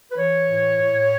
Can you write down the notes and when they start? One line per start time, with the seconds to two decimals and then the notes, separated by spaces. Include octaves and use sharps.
0.11 B4
0.17 E3 C#5
0.48 A2
0.79 A2